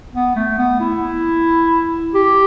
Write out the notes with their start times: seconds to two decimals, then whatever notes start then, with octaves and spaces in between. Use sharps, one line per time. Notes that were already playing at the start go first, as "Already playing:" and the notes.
0.14 B3
0.36 A3
0.58 B3
0.80 E4
2.14 G4